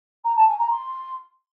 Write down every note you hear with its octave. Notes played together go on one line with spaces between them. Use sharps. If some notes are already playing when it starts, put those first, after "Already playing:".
A#5
A5
G#5
A#5
C6